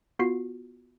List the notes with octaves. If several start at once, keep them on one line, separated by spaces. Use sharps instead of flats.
B3 F4 F#4 C7